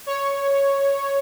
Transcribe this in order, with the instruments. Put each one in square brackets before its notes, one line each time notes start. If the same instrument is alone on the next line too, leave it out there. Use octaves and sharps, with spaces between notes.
[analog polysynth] C#5